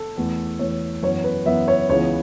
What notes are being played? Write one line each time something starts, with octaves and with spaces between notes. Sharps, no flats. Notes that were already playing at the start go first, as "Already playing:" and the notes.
Already playing: A4
E2 E3 A3
E2 E3 A3 C#5
F#2 E3 B3 C#5
B4
F#2 E3 B3 E5
C#5
C#2 C#3 E3 B3 C#5